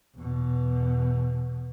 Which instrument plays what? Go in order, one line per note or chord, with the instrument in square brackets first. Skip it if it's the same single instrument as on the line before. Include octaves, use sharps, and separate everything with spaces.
[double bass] E2 B2